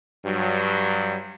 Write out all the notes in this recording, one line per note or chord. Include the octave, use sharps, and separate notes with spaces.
G2 F#3